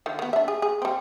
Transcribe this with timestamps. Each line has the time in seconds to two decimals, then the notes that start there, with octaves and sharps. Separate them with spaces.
0.06 D3 D#3 F3
0.19 D#3 B3
0.33 D4 E5
0.48 G#4
0.62 G#4
0.82 G3 C4